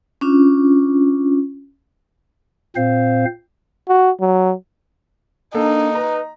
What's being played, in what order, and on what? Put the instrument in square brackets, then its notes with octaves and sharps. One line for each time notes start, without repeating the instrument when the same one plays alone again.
[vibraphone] C#4 D4 F4
[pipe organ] A#2 C4 C5 F5
[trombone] F#4
F#3
[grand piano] A#3 A4 [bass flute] D4 [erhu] D#4
[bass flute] B4 [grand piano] A#5